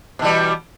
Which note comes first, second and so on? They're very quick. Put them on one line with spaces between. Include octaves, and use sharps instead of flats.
B2 E3 G3